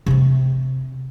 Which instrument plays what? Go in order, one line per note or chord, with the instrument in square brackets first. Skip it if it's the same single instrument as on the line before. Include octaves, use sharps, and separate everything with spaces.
[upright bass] C3 C4